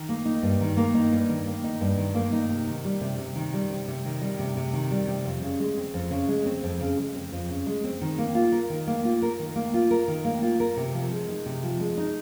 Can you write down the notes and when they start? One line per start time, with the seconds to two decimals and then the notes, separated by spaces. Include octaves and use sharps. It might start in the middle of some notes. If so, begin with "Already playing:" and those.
Already playing: D#3
0.09 A#3
0.25 D#4
0.43 G2
0.61 D#3
0.77 A#3
0.95 D#4
1.12 G2
1.29 D#3
1.46 A#3
1.64 D#4
1.81 G2
1.97 D#3
2.15 A#3
2.32 D#4
2.50 C3
2.67 D#3
2.85 G3
3.01 C3
3.18 C3
3.35 D#3
3.54 G3
3.70 C3
3.88 C3
4.05 D#3
4.21 G3
4.39 C3
4.57 C3
4.73 D#3
4.91 G3
5.07 C3
5.25 F2
5.42 C#3
5.60 G#3
5.77 C4
5.94 F2
6.11 C#3
6.28 G#3
6.46 C4
6.64 F2
6.81 C#3
6.98 G#3
7.15 C4
7.32 F2
7.50 C#3
7.66 G#3
7.84 C4
8.01 D#3
8.18 A#3
8.35 F4
8.52 A#4
8.70 D#3
8.87 A#3
9.05 F4
9.22 A#4
9.39 D#3
9.56 A#3
9.74 F4
9.91 A#4
10.08 D#3
10.25 A#3
10.42 F4
10.60 A#4
10.77 C3
10.94 F3
11.11 G#3
11.29 D#4
11.46 C3
11.63 F3
11.80 G#3
11.97 D#4